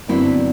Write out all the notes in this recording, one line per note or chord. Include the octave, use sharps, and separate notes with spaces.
G2 D3 F#3 B3 C4 E4